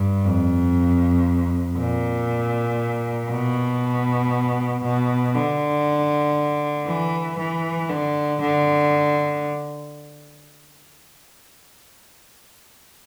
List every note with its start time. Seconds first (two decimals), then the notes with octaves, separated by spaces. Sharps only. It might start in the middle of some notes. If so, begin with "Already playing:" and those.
Already playing: G2
0.25 F2
1.78 A#2
3.30 B2
4.83 B2
5.35 D3
6.87 E3
7.38 E3
7.90 D3
8.41 D3